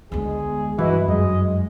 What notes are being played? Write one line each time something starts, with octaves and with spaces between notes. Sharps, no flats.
D2 G#3 B3 G#4
G2 E3 E4 F#4 B4 D#5
F#2 G#3 D#5